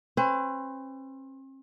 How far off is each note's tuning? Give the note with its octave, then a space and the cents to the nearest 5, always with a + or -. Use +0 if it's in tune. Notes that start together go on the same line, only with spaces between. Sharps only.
C4 +45 B4 +45